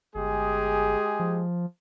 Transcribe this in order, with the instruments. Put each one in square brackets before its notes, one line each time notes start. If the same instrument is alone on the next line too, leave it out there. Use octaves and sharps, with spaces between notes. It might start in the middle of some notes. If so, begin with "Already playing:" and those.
[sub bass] G1 [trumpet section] G#3 G4 G#4
[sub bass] F3